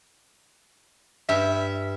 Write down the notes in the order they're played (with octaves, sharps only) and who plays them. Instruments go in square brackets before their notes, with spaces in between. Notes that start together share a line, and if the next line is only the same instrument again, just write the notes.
[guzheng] G2 [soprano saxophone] E5